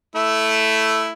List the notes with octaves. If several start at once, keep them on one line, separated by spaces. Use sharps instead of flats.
A3 E4